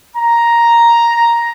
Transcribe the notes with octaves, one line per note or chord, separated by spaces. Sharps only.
A#5